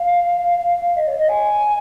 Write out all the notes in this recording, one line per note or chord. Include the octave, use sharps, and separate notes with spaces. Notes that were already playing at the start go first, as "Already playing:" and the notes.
Already playing: F5
D#5
C#5
D#5
G#5